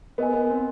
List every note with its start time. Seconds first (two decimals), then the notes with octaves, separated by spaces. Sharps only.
0.18 B3 A#4 D#5 G#5
0.33 B3
0.50 C4